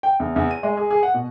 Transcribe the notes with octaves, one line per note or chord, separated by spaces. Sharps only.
G5
E2
E2
D#7
G#3
G#4
G#4
F#5
B2